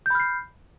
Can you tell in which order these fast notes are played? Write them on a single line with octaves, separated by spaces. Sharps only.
G6 B5 F6 C7